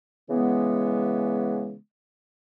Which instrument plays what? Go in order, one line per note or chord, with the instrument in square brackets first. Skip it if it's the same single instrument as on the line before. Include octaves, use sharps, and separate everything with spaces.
[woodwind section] C#3 E3 G#3 B3